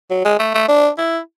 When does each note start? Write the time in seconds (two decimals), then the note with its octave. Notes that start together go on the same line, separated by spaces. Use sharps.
0.10 F#3
0.25 G#3
0.39 A3
0.54 A3
0.69 D4
0.98 E4